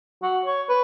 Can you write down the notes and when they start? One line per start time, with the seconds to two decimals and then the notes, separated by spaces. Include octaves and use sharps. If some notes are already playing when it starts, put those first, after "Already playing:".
0.22 F#4
0.45 C#5
0.69 B4